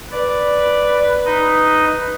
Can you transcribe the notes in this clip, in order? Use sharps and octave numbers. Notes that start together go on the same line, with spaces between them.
B4 D5
D#4 D#5